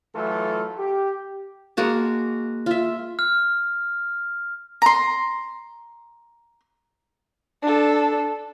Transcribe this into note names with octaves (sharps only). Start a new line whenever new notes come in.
E3 F#3 A3 F4 A4
G4
G#3 A#3 F#4 A5
F4 E5
F6
A#5 C6
D4 A4